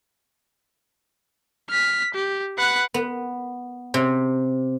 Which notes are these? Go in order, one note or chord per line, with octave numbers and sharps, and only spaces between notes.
F6 B6
G4
B4 F#5
B3
C3